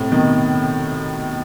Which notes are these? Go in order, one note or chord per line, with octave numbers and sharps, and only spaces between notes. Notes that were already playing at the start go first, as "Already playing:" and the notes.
Already playing: A2 C3
B2 D#3